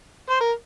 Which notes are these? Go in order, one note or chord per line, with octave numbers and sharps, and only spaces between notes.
C5
A#4